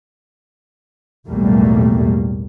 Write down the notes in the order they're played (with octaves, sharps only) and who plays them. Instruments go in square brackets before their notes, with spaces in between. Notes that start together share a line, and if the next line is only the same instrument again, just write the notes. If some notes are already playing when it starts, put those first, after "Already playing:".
[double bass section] B1 E2 A2 G3 A3 A#3